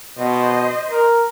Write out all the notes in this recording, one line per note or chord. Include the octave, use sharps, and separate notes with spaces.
B2 C5 D#5
A#4